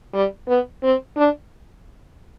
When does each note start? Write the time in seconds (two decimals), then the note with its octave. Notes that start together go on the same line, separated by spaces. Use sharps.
0.14 G3
0.48 B3
0.83 C4
1.17 D4